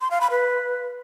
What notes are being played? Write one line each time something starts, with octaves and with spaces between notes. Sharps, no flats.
C6
F5
B5
B4